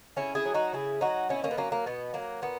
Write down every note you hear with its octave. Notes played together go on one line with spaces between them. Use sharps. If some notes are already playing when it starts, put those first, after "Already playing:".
C#3 C#4 E4
E4 G#4
F#3
D#4 F#4
C#3 E4 G#4
F#3 D#4 F#4
B2 C#4 E4
A#3 C#4
B3
F#3 A#3 C#4
A#3
B2 B3
F#3 A#3
A#2 B3